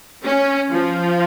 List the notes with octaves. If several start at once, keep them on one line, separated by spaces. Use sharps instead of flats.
C#4
F3